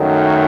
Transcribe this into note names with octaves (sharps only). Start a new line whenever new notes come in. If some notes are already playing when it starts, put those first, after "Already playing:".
Already playing: F#2 D#3 F#3 A3